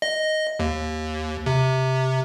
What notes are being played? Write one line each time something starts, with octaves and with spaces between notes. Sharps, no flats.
D#5
D#2
C3